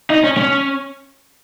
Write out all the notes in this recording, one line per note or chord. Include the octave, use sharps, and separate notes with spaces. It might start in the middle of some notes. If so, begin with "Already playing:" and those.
D#4
C#4
C#4